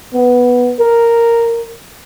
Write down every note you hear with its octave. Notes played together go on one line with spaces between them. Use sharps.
B3
A#4